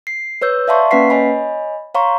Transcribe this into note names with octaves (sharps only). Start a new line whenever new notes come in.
C7
B4 C#5 E6 G6
D5 E5 F5 A5 C6 C#6
A#3 C#4 B4 F#5 B6 C7
C#5 D#5 G#5 B5
C#5 F5 A#5 C6 C#6